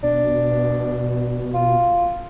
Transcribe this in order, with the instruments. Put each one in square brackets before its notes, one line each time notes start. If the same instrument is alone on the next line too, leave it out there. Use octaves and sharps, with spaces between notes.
[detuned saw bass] B2 [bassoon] D4
[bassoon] F4